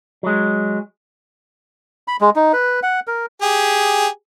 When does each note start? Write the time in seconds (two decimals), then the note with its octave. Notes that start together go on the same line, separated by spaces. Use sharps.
0.23 F#3 G#3
2.08 B5
2.21 G#3
2.36 D#4
2.53 B4
2.83 F#5
3.07 A#4
3.42 G4 G#4